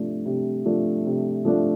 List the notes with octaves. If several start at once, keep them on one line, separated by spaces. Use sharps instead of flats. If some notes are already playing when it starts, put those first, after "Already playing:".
Already playing: C3 F3 A3 D4
C3
F3 A3 D4
C3
F3 A3 D4